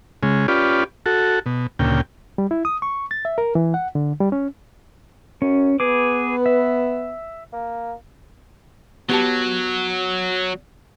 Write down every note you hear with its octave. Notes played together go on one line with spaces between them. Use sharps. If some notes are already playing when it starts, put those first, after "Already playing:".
C#3 G#3
C#4 F4 G4 B4 D5
F#4 A4
B2
D2 A#2 C#3 G5
G3
E4
D#6
C#6
A6
E5
A#4
E3
F#5
D3
G3
C#4
F#2 C#4
B3 G#4 B4 D6
E5
A#3
F#3 B3 G4 A5